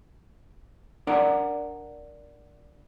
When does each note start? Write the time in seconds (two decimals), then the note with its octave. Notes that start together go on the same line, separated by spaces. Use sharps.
1.07 D4 A#4 D5 F#5 A#5